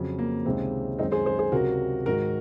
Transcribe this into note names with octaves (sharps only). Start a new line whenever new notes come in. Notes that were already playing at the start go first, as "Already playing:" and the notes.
Already playing: F2 C#3 F#3
A#3
C#2 C3 D#3 G#3 C4
F#2 D#3 G#3 C4 D#4
G#4 C5
G#4 C5
G#4 C5
C#2 C3 F#3 F#4 A#4
G#2 D#3 G#3 F#4 A#4